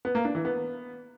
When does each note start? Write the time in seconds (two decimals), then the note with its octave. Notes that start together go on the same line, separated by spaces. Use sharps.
0.05 B3
0.15 A#3
0.25 D4
0.35 E3
0.45 B3